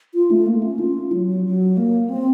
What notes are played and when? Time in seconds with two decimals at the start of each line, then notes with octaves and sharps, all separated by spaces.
0.15 F4
0.31 A3
0.47 A#3
0.63 C#4
0.79 F4
1.12 F#3
1.45 F#3
1.77 A#3
2.10 C4